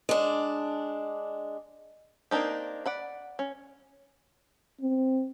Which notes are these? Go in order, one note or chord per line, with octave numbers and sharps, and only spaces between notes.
G#3 D4
A#3 C4 D4 D#4 G4
D5 F#5 B5
C#4
C4